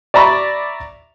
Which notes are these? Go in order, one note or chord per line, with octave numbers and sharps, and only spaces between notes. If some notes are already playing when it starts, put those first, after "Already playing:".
D5 E5 A#5 B5 C#6